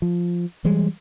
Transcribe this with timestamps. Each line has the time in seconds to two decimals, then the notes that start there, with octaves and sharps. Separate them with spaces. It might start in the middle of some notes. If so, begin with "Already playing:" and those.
0.02 F3
0.65 E3 G3 G#3